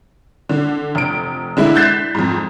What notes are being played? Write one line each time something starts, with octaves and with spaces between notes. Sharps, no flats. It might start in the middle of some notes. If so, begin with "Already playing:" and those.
D3
F1 D7
D3 G#3 E4
F#6 G6 A6 B6 C7 E7
F2 G#2